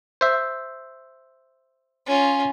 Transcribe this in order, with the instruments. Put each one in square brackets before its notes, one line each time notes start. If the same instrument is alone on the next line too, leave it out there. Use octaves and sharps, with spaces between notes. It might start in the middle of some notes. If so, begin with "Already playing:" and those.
[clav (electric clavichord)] C5 E5
[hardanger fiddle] C#4 F4